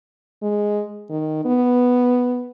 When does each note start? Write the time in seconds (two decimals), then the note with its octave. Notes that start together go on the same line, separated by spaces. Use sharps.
0.43 G#3
1.10 D#3
1.45 B3